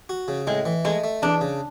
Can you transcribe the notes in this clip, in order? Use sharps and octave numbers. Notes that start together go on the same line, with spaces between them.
F#4
C#3
A2 G#3
E3
G#3 A3
A3
E2 D4
C#3